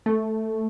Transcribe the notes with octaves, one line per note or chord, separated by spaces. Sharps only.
A3